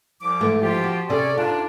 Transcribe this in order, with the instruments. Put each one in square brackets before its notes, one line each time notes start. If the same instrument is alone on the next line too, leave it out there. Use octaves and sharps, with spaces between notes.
[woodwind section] C2 F3 D6
[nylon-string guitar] G#2 E3 A3
[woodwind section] F3 F4 G4
[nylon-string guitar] F#4
[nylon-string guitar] C3 G#4 A4 [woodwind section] C#4 D5
[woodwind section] G#2 C3 D4 [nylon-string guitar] F4